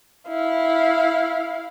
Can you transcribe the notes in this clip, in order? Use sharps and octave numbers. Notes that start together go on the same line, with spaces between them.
E4 F5